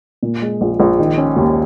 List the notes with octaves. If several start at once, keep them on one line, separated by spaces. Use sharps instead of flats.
A#2
G#3
A#1
A#1
D#3
C#4
D#2